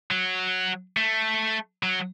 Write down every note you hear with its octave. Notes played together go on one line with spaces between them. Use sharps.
F#3
A3
F#3